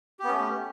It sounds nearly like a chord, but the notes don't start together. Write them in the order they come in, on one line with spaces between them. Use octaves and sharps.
G4 B3 C#4 A3